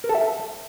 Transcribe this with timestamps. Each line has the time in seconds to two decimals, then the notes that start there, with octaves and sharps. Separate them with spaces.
0.04 A#4
0.09 A4
0.15 E5